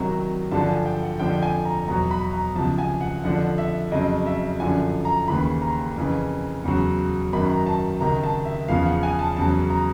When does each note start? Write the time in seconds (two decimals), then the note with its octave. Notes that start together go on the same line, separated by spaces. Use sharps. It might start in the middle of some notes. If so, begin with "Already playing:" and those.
Already playing: C2 C3 D#3 F#3 A#5
0.51 G2 D3 F3 A5
0.63 A5
0.69 G#5
0.86 G5
1.03 F#5
1.19 F2 D3 F3 G5
1.42 G#5
1.65 A#5
1.87 E2 B2 F#3 A#5
2.11 B5
2.33 A#5
2.55 C#2 C3 F3 A5
2.78 G#5
3.01 F#5
3.24 F2 D3 F3 F#5
3.58 E5
3.92 F2 C#3 F#3 D#5
4.26 E5
4.60 F#2 D3 F3 G#5
5.05 A#5
5.28 D#2 C#3 E3 B5
5.62 A#5
5.96 F2 C#3 E3
6.64 E2 C#3 F#3
7.32 F#2 D#3 F#3 B5
7.50 A#5
7.66 A5
8.01 C#2 C3 D#3 A#5
8.24 A5
8.45 E5
8.68 E2 C#3 F3 F5
8.86 F#5
9.03 G#5
9.19 A5
9.37 E2 C#3 F#3 A5
9.70 A#5